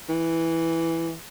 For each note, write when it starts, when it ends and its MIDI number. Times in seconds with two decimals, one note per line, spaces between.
0.09 1.14 52